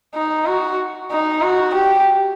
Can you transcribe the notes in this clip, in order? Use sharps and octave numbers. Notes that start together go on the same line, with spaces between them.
D#4
F#4
D#4
F#4
G4